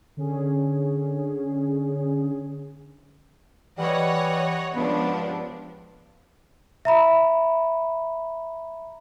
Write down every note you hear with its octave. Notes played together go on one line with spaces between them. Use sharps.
D3 C#4 G#4
E3 G3 C#5 D#5 F#5
C#2 G2 F3 B3 D4
E5 A#5 B5